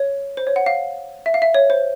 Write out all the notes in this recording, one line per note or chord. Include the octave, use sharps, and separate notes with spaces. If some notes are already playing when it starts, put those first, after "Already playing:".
Already playing: C#5
C5
C#5
F#5
F5
E5
F5
E5
C#5
C5